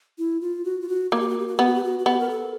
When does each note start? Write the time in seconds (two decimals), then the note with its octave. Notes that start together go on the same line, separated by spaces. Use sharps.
0.18 E4
0.41 F4
0.65 F#4
0.81 F4
0.89 F#4
1.11 A#3 F#4
1.20 G4
1.29 F#4
1.39 G4
1.47 F#4
1.57 B3 G4
1.66 F#4
1.75 G4
1.84 F#4
1.99 F#4
2.06 B3 G4
2.19 A#4
2.29 A4